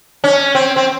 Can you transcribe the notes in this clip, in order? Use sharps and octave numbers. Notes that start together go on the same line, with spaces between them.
C#4
C4
C4